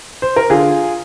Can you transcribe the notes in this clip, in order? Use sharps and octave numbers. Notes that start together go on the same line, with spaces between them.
C5
A#4
D3 F4 G#4